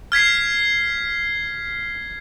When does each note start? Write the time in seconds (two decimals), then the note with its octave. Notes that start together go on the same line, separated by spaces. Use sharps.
0.12 F6 G#6 B6 C7